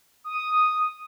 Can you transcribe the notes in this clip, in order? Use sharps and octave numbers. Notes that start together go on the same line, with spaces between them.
D#6